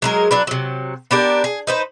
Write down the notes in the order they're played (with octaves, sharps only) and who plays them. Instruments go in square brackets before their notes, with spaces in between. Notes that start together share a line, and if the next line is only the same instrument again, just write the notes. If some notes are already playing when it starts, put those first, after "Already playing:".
[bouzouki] F#3 G#3 A#4
F#3 D4 B4
C3 F#3
B3 D4 G4 A#4
G#4
D#4 B4 C5